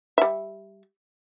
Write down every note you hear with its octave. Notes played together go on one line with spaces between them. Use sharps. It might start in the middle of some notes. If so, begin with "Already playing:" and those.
G3 E5